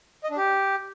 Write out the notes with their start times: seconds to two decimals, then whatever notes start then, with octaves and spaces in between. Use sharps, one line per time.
0.24 D#5
0.30 D4
0.37 G4